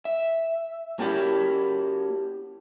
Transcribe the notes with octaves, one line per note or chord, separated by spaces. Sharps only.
E5
A#3 C#4 E4 F#4 G4 A5